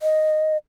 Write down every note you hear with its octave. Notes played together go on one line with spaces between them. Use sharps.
D#5